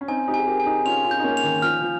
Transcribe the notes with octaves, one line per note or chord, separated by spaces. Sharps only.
C#4
C4 D#4 G#5
D#4 G4
G#4 G#5
G4 A#4
G#5
D#4 G4
C#4 F4 F7
C#4 F4
G6
D#4
A#3 C#4
F7
D#3
F3 F6
F3